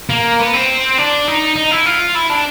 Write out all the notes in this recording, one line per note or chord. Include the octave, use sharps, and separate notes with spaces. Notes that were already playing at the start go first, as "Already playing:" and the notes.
A#3
B3
C4
D4
D#4
D#4
E4
F4
E4
D4